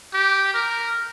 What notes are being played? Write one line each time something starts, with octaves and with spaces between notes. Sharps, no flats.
G4
A#4